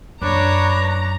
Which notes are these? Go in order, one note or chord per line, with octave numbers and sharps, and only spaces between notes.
F#2 D4 B4 C#5 A#5 D6